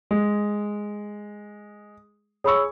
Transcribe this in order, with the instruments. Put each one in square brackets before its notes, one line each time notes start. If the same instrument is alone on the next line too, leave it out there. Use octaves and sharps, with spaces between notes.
[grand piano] G#3
[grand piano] G#4 C#6 [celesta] C#5 B5 E6